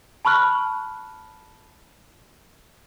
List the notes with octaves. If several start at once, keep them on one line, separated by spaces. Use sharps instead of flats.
A5 B5 C#6 F6 F#6